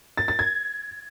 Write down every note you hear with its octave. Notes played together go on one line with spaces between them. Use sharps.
A6
A6
G#6